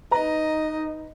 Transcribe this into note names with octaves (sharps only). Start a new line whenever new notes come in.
D#4 B4 D#5 A#5